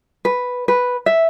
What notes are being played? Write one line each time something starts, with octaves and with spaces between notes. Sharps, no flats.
B4
B4
E5